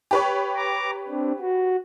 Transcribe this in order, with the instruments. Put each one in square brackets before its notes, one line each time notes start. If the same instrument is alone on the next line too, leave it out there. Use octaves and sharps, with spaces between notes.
[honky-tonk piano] G4 B4 C#5
[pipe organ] A#5 D6
C4 D4
F#4